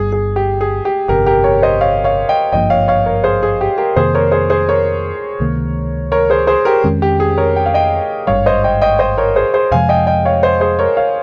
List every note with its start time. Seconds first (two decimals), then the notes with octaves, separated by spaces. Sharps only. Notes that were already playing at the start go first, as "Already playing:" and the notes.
Already playing: G1 G2 G3 G#4
0.12 G#4
0.36 G4
0.61 G#4
0.85 G4
1.08 G1 F2 C3 G4 A#4
1.26 G4 A#4
1.44 A#4 C#5
1.62 C5 D#5
1.81 C#5 F5
2.04 C#5 F5
2.29 D#5 G5
2.52 G#1 G2 F3 A#3 D#5 G5
2.70 C#5 F5
2.88 C#5 F5
3.06 A#4 C#5
3.24 G#4 C5
3.43 G#4
3.61 G4
3.78 G4 A#4
3.96 F2 C3 D#3 A#3 G#4 C5
4.15 A#4 C#5
4.32 G#4 C5
4.50 G#4 C5
4.69 A#4 C#5
5.40 C#2 C3 D#3 A#3
6.12 A#4 C#5
6.30 G#4 C5
6.47 G#4 C5
6.65 G4 A#4
6.84 F2 D#3 G#3 C#4
7.02 G4
7.20 G#4
7.38 A#4 C#5
7.56 G5
7.66 F5
7.74 D#5 G5
8.27 G#1 G2 G3 C#5 F5
8.46 C5 D#5
8.64 D#5 G5
8.81 D#5 G5
8.99 C5 D#5
9.18 A#4 C#5
9.36 G#4 C5
9.54 G#4 C5
9.71 F2 C3 F3 G#3 F5 G#5
9.89 D#5 G5
10.07 D#5 G5
10.25 C#5 F5
10.43 C5 D#5
10.61 G#4 C5
10.79 A#4 C#5
10.97 C#5 F5